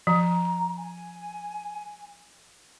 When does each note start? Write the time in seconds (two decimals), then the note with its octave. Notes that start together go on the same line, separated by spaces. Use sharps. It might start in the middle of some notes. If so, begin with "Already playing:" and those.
0.07 F3 A#5
0.77 G#5